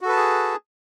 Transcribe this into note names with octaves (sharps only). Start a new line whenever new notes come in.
F#4 G#4 A4 B4 A5